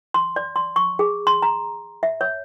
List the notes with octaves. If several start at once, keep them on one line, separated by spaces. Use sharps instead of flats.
C6
D5
C6
C#6
G#4
C6
A#5
E5
C#5